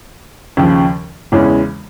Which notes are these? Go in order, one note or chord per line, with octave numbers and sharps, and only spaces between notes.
D#2 C#3 F3
E2 C#3 E3 G#3 C#4